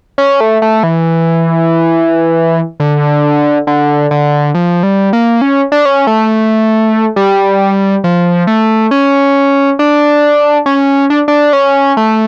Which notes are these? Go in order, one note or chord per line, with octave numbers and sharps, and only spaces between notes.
C#4
A3
A3
E3
D3
D3
D3
F3
G3
A#3
C#4
D4
C#4
A3
G3
F3
A3
C#4
D4
C#4
D4
D4
C#4
A3